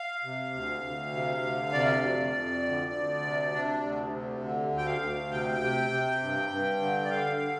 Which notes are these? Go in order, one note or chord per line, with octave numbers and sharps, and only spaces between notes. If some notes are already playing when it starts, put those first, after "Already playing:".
Already playing: F5
C3
D2
D2
C3
D2
C3 D5
F2
F2
D2
D2
C3
C3 D4
D2
C3
D3
D2
G5
F5
D2
C3 G5
C3
C3
G2
G2
D3
D5
D3 F5
D3